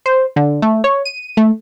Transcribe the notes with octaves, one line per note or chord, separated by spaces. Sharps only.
C5
D3
A3
C#5
D#7
A3